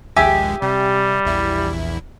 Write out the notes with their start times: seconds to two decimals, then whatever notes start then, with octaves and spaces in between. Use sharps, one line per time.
0.17 A#1 D#2 G#3 G4 E5 G#5
0.62 C3 G3
1.25 A#1 E2 E4